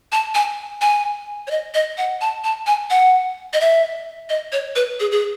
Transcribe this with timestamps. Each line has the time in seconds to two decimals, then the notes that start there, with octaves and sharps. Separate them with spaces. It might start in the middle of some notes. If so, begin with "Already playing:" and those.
0.12 A5
0.35 G#5
0.81 G#5
1.47 C#5
1.51 D#5
1.74 D#5
1.97 F#5
2.21 A5
2.44 A5
2.67 G#5
2.90 F#5
3.53 D#5
3.61 E5
4.30 D#5
4.52 C#5
4.76 B4
5.00 G#4
5.12 G#4